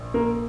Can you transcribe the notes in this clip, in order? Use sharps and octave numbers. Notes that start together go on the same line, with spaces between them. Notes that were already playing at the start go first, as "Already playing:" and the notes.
Already playing: A#1
A#3 A#4